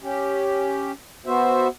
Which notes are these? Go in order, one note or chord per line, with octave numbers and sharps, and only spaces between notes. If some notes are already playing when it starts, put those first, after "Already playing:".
C#4 G4
B3 F#4 C5 E5